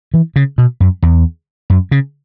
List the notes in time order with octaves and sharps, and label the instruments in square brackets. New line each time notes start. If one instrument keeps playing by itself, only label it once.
[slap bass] E3
C#3
B2
F#2
E2
F#2
C#3